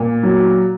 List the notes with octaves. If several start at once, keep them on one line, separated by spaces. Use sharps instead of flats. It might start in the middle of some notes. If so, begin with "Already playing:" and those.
Already playing: A#2
F#3